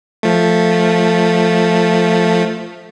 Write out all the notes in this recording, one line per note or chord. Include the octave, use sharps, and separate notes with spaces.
F3 A3